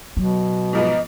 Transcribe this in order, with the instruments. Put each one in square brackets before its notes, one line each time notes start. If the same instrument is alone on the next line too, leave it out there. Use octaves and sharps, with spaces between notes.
[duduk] B2 [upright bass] F#3
[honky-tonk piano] G#2 F3 B3 [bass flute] D#5